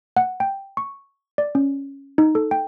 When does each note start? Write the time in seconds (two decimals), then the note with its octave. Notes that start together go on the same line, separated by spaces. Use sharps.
0.17 F#5
0.40 G5
0.77 C#6
1.38 D5
1.55 C#4
2.18 D#4
2.35 A4
2.51 G5